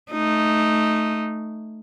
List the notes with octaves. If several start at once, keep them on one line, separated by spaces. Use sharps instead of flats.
A3 D#4